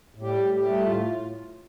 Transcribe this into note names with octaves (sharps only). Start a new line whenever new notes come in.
A2
G3 G4
A2
G3 G4
A3
A2 F4
A2